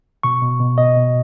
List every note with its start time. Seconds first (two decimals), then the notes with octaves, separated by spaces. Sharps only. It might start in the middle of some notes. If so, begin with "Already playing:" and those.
0.23 B2 C#6
0.42 B2
0.60 B2
0.78 B2 D#5
0.97 B2